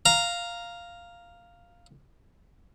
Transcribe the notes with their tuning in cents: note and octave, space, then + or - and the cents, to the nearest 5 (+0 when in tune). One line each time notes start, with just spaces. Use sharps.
F5 +0 A#5 +0